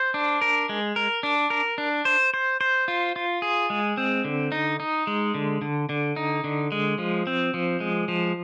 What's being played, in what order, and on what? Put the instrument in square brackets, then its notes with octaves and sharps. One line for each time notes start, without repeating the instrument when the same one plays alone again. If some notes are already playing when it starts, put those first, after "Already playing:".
Already playing: [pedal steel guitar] C5
D4
A#4
G#3
A#4
D4
A#4
D4
C5
C5
C5
F4
F4
G#4
G#3
C4
D3
D#4
D#4
G#3
D3
D3
D3
D#4
D3
G#3
F3
C4
F3
G#3
F3